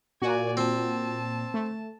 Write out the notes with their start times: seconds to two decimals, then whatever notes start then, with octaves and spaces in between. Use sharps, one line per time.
0.22 A#2 F#4 D5 G#5
0.57 C4 A5
1.54 A3